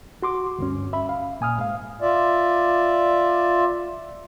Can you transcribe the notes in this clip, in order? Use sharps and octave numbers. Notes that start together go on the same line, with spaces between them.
F#4 C6 D6
D2 G2 C#4
E5 B5
F5
A#2 G#5 D#6 F6
G#2 F5
F4 D5 E5